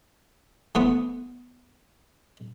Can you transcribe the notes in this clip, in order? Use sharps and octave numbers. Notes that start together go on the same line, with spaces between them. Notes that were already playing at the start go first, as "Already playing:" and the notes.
E3 A3 B3 C4 F#5 D#6